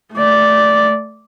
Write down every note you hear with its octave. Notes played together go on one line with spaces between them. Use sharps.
A3 D5